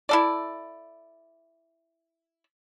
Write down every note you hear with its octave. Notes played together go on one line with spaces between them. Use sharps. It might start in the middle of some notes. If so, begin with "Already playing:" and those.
E4 A4 D5